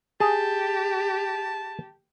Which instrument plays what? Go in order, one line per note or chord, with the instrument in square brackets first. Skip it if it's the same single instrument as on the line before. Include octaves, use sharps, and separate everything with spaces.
[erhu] G4 [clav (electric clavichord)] G#4 [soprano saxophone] A5